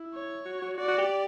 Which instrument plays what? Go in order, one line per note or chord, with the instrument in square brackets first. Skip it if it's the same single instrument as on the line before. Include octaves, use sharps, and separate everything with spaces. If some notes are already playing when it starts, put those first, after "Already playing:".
Already playing: [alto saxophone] E4
[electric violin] C#5
[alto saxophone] F#4
F#4
[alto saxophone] F#4 [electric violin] D5
[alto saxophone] F#4
G4